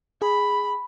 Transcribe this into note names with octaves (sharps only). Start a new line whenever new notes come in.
G#4 B5